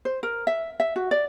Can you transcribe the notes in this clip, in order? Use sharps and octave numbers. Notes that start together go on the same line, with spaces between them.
C5
A#4
E5
E5
F#4
D5